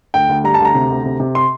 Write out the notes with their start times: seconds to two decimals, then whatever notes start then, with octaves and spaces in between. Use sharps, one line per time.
0.14 D2 G5
0.29 D2
0.44 G3 A#5
0.54 A5
0.60 D2 A#5
0.75 C3
0.90 D2
1.05 C3
1.20 C3
1.35 C6